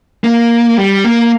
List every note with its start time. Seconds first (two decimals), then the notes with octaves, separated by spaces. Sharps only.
0.24 A#3
0.77 G3
1.04 A#3